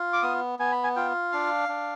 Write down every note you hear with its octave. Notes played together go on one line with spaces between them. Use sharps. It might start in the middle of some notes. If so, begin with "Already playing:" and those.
Already playing: F4
D6
B3 D#6
B3 G#5
B5
G#5
F4 G5
D4 F5
D4